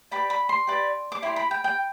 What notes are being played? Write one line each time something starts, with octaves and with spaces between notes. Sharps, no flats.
G4 B4 D5 B5
B5
C6
G4 B4 D5
D6
E4 G4 D5 C6
B5
G5
G5